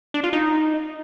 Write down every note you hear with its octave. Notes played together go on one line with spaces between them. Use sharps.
D4
F4
D#4